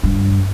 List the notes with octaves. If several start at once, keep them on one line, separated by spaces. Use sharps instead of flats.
G2